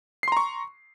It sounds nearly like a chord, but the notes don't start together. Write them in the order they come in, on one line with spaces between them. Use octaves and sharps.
C7 C6 A#5 C#6